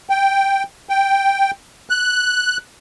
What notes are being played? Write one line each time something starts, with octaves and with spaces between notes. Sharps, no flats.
G5
G5
F#6